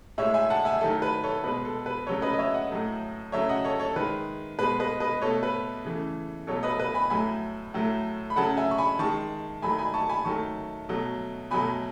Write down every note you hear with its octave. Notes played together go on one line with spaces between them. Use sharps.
A2 G#3 C#5 E5
E5 G#5
F#5 A5
E5 G#5
D#3 F#3 A3 A4
B4
A4 C#5
B2 G#3 B4
A4
B4
C#3 F#3 A3 A4 C#5
B4 D#5
D#5
C#5 E5
D#5 F#5
A2 F#3 A3
C#3 F#3 A3 C#5 E5
D#5 F#5
A4 C#5
A4 C#5
D#3 G#3 B4
B2 G#3 B4
B4 D#5
B4 D#5
B2 A3 A4 C#5
B4
C#3 E3 A3
B2 F#3 A3 A4 C#5
B4 D#5
B4 D#5
G#5 B5
A2 F#3 A3 G#5 B5
A2 F#3 A3
B5
C#3 F#3 A3 F#5 A5
E5 G#5
C#6
G#5 B5
D#3 G#3 A5 C#6
D#3 F#3 A3 G#5 B5
G#5 B5
A5 C#6
G#5 B5
D#3 F#3 A3 A5 C#6
B2 F#3 A3
B2 F#3 A3 G#5 B5